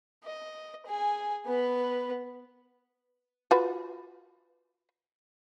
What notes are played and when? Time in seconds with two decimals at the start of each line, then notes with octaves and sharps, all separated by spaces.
0.24 D#5
0.86 G#4 G#5
1.46 B3 B4
3.51 F4 F#4 B4